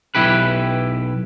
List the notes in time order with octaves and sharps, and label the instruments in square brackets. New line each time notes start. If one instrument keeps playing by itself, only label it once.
[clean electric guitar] B1 E4 G4 B4